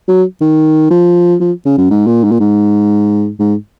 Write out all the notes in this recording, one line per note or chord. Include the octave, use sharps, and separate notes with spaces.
F#3
D#3
F3
F3
C#3
F#2
G#2
A#2
G#2
A#2
G#2
G#2